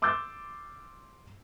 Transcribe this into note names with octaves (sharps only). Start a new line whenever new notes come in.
C6 D6 E6 F6 G6 A6